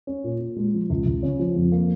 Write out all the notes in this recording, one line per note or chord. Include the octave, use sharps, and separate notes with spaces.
C#4
A#2
A#2
G#3
F3
C#2
C#2
C#3
F3
F2
A#3